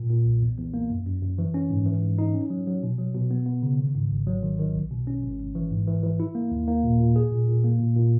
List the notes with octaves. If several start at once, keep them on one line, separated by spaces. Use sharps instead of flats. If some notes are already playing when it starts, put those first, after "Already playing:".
Already playing: A#2
A#2
B1
E2
E2
A#3
F#2
F#2
F#2
E3
C#4
G#2
E3
G#2
D#4
C#4
F#3
F#3
B2
F#3
B2
B3
B3
C#3
D#3
G#2
G#1
F#3
D#3
D#3
B1
B2
C#4
G#1
G#1
E3
G#2
E3
E3
E4
A#3
D#2
A#3
A#2
A#2
G#4
A#2
A#2
A#3
A#2
A#2